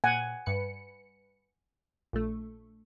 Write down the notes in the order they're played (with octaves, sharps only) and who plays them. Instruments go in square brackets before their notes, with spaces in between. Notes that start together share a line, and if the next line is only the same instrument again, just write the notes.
[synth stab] A#2 [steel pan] F#5 G#5
[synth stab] G2 B4 C#7
A#1 A3